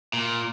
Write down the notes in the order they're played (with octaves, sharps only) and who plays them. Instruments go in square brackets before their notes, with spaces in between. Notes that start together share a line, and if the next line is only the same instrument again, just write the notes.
[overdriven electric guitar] A#2